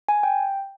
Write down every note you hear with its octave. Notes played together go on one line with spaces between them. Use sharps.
G#5
G5